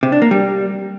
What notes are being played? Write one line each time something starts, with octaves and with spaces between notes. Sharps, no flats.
C3
D4
A#3
G3